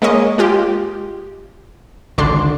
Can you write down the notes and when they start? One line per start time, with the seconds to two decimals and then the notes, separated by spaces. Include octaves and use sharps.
0.02 G#3 A#3 C#5 D#5
0.38 G#3 F4 G4
2.18 G#1 C#2 D3 D4 C6